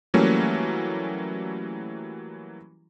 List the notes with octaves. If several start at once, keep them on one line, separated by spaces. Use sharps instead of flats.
E3 F#3 G3 A3 A#3 C#4